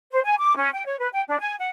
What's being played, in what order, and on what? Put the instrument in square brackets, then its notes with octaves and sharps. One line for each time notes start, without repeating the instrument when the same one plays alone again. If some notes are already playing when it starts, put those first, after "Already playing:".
[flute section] C5
G#5
D6
C#4
G5
C#5
B4
G5
D4
G#5
F#5